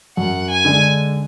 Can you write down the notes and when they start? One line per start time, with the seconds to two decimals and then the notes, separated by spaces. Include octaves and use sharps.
0.17 F#2 F#5
0.50 G#5
0.65 D3 G#3 D4